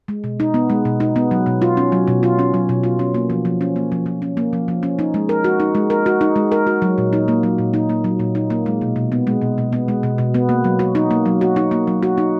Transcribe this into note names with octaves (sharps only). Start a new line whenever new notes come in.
G#3
B2
D#4
B3
G#3
B2
D#4
B3
F#3
B2
F4
C#4
F#3
B2
F4
C#4
F#3
B2
F4
C#4
A#3
F3
F3
C#4
A#3
F3
F3
C#4
A#3
F3
F3
C#4
D#4
G#3
A#4
F#4
D#4
G#3
A#4
F#4
D#4
G#3
A#4
F#4
F#3
A#2
D#4
A#3
F#3
A#2
D#4
A#3
F#3
A#2
D#4
A#3
G#3
B2
B2
B3
G#3
B2
B2
B3
G#3
B2
B2
B3
A#3
F#3
F#4
D#4
A#3
F#3
F#4
D#4
A#3
F#3
F#4
D#4